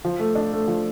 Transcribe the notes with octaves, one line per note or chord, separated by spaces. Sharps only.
F3
A3
D4
A3
F3